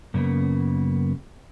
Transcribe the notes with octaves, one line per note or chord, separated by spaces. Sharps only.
F#2 C#3 A#3 B3